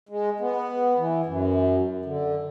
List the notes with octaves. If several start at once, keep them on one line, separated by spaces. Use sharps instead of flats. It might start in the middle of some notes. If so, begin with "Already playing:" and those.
G#3
B3
E3
F#2
D3